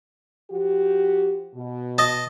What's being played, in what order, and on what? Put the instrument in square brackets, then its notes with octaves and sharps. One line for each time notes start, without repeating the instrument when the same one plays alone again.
[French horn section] F3 F#4 G4
B2
[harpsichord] D#5 A5